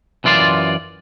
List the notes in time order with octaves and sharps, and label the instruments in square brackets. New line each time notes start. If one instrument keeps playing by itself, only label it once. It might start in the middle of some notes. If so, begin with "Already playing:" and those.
[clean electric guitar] F#2 E3 F4 D5 C6